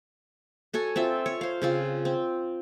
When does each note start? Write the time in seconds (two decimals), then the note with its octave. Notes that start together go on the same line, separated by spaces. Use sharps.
0.74 F#4 A4 C#5 G#5
0.96 C4 F4 E5
1.26 C#5
1.41 C5 F5
1.62 C#3 C4 F4
2.05 C4